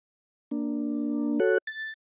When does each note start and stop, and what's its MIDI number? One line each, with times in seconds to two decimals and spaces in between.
0.51 1.39 58
0.51 1.39 62
1.40 1.58 66
1.40 1.58 69
1.40 1.58 73
1.40 1.58 90
1.67 1.93 93